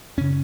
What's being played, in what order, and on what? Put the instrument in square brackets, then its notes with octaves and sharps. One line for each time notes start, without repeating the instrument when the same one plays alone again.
[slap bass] F#2 C#3 C#4